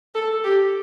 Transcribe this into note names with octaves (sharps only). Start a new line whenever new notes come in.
A4
G4